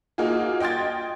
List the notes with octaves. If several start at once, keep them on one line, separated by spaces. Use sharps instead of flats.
A#3 D#4 F4 F#4 G#4
D#5 G5 C6 G#6 A6